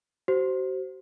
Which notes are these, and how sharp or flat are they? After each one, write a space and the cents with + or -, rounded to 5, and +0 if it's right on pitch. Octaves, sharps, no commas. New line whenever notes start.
F#4 +40 C5 +0